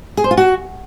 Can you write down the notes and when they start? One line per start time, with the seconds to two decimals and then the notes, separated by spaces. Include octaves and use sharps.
0.17 G#4
0.24 C5
0.31 F4
0.37 F#4